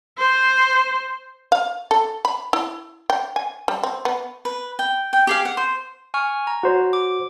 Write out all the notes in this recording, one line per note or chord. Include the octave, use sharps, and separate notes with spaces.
C5
F5
A4
B5
E4
G5
G#5
G3
C4
B3
B4
G5
G5
G4 G#4 F5
F#5
C5
G#5 C#6 F6
A#5
F#4 C5 C#5
D6